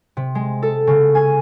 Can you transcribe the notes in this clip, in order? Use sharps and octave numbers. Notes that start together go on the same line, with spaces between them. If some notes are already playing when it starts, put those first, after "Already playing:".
C3
G#3
A4
C#3
G#5